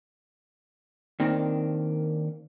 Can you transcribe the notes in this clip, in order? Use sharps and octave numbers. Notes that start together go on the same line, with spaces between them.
D#3 A#3 C4 D4